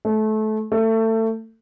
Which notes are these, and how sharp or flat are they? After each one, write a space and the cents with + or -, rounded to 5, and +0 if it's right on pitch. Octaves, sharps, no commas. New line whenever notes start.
A3 -25
A3 +25